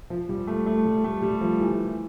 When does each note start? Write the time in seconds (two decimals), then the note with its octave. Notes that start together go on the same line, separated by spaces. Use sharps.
0.10 F3
0.29 G3
0.47 A3
0.66 A3
0.86 G3
1.04 A3
1.22 G3
1.41 F3
1.61 E3